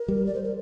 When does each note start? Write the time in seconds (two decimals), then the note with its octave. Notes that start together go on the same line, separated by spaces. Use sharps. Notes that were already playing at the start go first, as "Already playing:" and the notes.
Already playing: A#4
0.08 G3
0.26 D5
0.34 C5
0.44 A#4